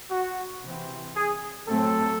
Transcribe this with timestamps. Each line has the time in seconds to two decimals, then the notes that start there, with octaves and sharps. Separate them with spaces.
0.11 F#4
0.64 C3 E3 C4
1.16 G#4
1.68 A2 F#3 A3 C4 A4